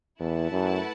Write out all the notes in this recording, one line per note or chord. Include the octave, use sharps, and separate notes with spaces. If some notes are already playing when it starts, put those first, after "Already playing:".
E2 A3 E4 B4 F#5 A5
F#2